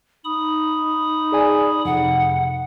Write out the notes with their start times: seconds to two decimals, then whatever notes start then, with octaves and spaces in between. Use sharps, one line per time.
0.25 D#4 B5 D#6
1.32 G#4 D5 G#5
1.85 F2 C3 F#5